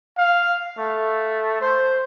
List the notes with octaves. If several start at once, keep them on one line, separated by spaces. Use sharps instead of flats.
F5
A3
C5